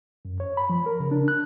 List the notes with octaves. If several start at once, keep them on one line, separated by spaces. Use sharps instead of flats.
F#2
C#5
B5
F3
A#4
C#3
D4
F#6